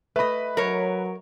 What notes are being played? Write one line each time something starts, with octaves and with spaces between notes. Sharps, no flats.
A3 B4 D#5 B5
F#3 A#4 C#5